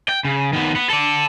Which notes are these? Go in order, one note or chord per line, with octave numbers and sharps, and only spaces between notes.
G5
C#3
D#3 B3
B3
A4 D5